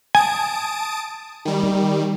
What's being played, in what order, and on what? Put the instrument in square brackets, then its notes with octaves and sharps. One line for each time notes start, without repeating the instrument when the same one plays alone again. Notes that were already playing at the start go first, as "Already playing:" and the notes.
[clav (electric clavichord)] G#5 [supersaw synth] A5 D#6 D7
[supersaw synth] D#3 G3